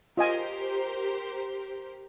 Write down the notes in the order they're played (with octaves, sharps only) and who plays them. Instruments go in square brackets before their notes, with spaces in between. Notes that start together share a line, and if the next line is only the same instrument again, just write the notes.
[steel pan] F4 D#5 G#5 [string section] G4 A#4 C5